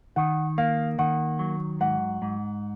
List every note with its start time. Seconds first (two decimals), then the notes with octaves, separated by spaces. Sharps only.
0.16 D#3 F#5
0.58 A#3 F5
0.99 D#3 F#5
1.39 F#3
1.81 G#2 F#5
2.22 G#2